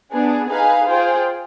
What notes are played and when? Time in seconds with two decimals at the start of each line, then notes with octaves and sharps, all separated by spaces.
0.12 B3 D4 G#4
0.50 D#4 G#4 B4 F5 G#5
0.88 F4 G#4 C5 G5